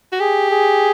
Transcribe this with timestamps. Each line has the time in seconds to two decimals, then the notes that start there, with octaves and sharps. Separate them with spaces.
0.12 F#4
0.20 G4 G#4
0.51 G#4